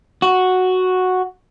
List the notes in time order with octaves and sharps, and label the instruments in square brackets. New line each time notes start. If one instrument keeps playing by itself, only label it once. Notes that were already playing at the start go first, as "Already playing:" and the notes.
[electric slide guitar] F#4